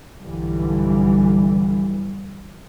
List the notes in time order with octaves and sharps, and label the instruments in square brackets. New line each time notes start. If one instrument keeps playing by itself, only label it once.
[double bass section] B1 G2 D3 E3 G3